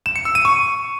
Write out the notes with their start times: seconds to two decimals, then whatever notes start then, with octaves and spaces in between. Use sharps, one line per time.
0.06 E7
0.16 C#7
0.25 E6
0.35 D#7
0.45 C#6